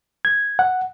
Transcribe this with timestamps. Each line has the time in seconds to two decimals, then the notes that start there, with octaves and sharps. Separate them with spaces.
0.25 G#6
0.59 F#5